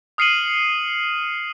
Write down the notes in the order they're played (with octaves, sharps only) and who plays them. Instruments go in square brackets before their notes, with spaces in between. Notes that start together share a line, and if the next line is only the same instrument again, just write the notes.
[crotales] D#6 F6 C7 C#7 D#7 F#7